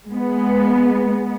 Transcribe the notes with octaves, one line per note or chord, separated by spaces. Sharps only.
G#3 B3